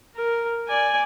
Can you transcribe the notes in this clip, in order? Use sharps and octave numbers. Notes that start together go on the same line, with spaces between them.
A#4
D5 G#5